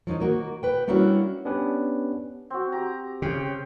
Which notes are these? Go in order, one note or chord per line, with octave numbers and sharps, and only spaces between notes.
F3 F#3 D4 D#4
D#3 A#3 F#4
B4 G5
G3 A#3 C#4 D4 E4 F#4
B3 C#4 D4 G4 B4
C4 F#4
G4 A#5
C#3 G4 G5